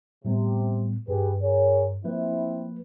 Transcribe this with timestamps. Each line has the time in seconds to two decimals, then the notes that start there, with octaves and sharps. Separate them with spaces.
0.25 A2 C3 G3 B3
1.08 G2 G4 G#4 B4
1.42 G#4 A#4 C#5
2.04 F3 A#3 C4 E4 B4 E5